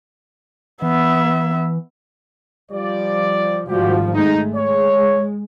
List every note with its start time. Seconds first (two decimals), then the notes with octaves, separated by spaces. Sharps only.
0.82 E3 B3 E5
2.71 F3 G3 D5
3.69 G#1 F3 G3 F#4 G4
4.14 G#3 A3 D#4
4.55 G#3 C#5